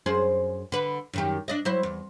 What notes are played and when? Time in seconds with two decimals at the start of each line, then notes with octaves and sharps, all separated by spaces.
0.06 F#2 G#4 C5
0.72 D3 B4
1.13 F#2 D#3 G4
1.48 D4 D5 D#5
1.65 F#3 E4 C5
1.83 E2